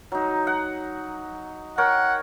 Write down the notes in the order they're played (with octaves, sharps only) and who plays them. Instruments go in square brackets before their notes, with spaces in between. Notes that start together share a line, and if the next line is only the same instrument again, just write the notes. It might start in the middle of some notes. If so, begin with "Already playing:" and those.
[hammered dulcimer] F#3 D#4
F#5
[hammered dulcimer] A#4 C#5 G5 [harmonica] F#5